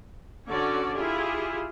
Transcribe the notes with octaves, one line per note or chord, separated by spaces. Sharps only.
D3 C#4 F#4 C#5 D5
E4 F4 G4 G#4